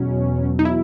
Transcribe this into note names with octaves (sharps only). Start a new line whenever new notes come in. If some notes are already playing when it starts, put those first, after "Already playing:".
Already playing: E2 B2 F#3 C#4
D#4
E4